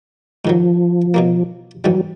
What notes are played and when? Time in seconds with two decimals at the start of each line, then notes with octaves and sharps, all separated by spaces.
0.45 G#2 D#3 F3 F#3
1.14 B2 F#3 A#3
1.84 G#2 E3 F#3 G3